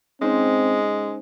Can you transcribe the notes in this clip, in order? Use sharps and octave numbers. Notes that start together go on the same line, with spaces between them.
G#3 C4 C#4 D#4 C5